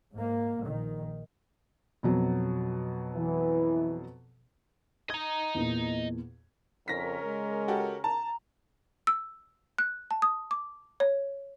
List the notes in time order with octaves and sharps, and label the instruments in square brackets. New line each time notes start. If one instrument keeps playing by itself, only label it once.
[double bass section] G#2 A#3
A#1 D#3
[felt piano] F2 B2 F#3
[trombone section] E3
[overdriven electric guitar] D#5 A#5 [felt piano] G#6
[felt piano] E2 A#2
[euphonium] F2 [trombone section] C#3 C#4 A#4 [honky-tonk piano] A#6 B6
[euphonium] G#3
[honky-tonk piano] F#4 G4 A4
[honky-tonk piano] A5 [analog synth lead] A#5
[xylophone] E6
F#6
A5
D#6
D6
C#5